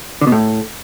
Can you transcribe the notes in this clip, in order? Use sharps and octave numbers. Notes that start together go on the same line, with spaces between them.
D3
B2
A2